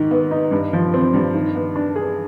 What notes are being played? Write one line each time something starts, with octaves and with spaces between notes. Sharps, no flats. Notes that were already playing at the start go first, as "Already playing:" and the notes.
Already playing: G#2 D#3
B3
D#4
G2
F3
C4
G2
D#3
B3
D4
G#4